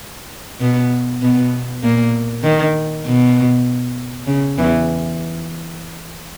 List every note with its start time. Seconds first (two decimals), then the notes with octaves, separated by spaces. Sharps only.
0.60 B2 B3
1.22 B2 B3
1.83 A#2 A#3
2.43 D#3
3.06 B2
4.27 C#3
4.58 E2 E3